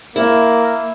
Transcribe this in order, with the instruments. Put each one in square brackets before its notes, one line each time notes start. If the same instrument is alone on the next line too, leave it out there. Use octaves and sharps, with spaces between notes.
[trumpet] A#3 [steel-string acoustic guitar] E4